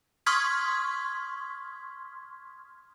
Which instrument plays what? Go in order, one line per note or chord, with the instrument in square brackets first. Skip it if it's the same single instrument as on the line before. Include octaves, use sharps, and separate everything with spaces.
[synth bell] C6 C#6 D#6 F6 G#6 B6